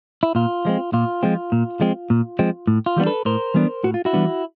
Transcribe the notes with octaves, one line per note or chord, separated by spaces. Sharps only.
E4
A#2 F4
F3 G#3 C4
A#2 F4
F3 G#3 C4
A#2
F3 G#3 C4
A#2
F3 G#3 C4
A2
F4
E3 G3 B3 D4
A4 B4
A2 A#4 C5
E3 G3 B3 D4
A2 F#4
F4
E4 F#4
E3 G3 B3 D4